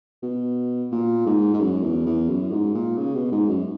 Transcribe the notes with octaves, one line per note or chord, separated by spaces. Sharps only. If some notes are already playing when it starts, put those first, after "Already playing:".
B2
A#2
G#2
G#2
F#2
E2
E2
F#2
G#2
A#2
C#3
B2
G#2
F#2